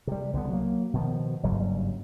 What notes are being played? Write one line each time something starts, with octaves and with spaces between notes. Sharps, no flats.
C3 G3
C2 D3 D#3 B3
F#3 A#3
B2 D#3 F3
F#1 G2 F#3 G3